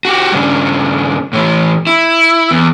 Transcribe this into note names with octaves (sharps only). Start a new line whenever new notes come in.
F#4 G4
G2 C#3
A2 E3
E4
E2